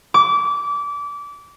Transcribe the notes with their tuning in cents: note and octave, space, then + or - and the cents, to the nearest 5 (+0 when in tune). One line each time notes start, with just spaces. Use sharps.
D6 -25